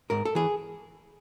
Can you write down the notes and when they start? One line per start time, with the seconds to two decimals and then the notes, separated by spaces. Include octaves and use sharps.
0.10 G#2 A#4
0.25 A4
0.35 E3 G#4